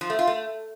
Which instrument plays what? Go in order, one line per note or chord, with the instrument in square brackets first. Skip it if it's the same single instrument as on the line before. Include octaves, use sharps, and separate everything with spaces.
[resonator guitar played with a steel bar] F3
A3
F4
A3